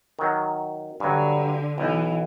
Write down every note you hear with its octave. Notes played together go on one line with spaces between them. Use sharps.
D#3 F#3
G2 D3 F#3
B1 E3